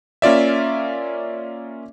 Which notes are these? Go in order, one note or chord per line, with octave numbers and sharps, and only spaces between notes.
A#3 C#4 F4 D5 E5